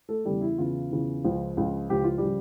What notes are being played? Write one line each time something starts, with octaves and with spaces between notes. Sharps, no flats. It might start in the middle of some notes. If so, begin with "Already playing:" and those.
A3 A4
E2 C#3 E3 G3 G4
E4
E2 C#3 E3 F4
E2 C#3 E3
C#2 C#3 F3
C#2 C#3 F3
C#2 C#3 F3 G4
F4
G3 G4
C#3 F3